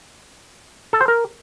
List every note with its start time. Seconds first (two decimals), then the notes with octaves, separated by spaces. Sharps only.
0.93 A4
1.01 C5
1.08 A#4